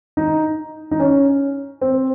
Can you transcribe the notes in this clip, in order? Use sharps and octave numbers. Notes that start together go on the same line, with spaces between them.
D#4
D#4
C#4
C4